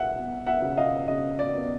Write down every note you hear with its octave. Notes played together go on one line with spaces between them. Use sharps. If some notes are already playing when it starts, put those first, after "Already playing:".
Already playing: E4 E5 F#5
B3
E5 F#5
C#3
D#5 F5
C#3 D#5
D5
B3